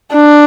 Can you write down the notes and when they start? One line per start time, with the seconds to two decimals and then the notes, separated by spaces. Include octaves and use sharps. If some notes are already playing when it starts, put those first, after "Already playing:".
0.15 D4